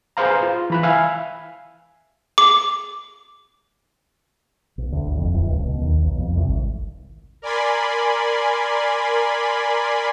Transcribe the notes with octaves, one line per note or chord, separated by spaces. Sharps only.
G#4 B4 C5 F5 A#5
F4
E3 B5 F#6
E5 F5 G#5
D6
B1
D2
G1
F2
D1
C#2
B2
D#2
B1
F2
C2
G#1
A#4 D5 G#5 B5 C6